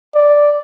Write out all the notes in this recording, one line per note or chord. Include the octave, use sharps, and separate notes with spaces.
D5